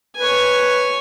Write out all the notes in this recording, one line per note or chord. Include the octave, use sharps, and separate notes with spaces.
B4 C#5 G#5